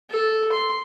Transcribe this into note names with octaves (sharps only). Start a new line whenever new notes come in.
A4
C6